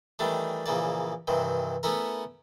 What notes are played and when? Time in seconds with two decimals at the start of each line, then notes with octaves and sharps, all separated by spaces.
0.19 D#3 E3 G3 A3 D4
0.66 A#1 C#3 E3 A#3 D5
1.28 G2 C3 D#3 E3
1.83 A3 B3 C#4 E4 A#4